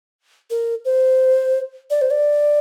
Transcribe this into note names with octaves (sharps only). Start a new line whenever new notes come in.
A#4
C5
D5
C5
D5